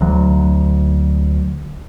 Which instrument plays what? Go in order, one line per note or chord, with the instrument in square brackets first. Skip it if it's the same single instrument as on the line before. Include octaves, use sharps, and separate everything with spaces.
[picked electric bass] D2 F#3